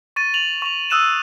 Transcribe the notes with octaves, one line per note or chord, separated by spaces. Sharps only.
C#6 A6 D#7
F7 F#7
C#6 F7
D#6 E6 F#6 D#7 E7